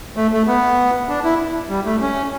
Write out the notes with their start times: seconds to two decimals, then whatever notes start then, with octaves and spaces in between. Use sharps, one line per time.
0.17 A3
0.32 A3
0.47 B3
1.09 D4
1.24 E4
1.70 G3
1.85 A3
2.01 C#4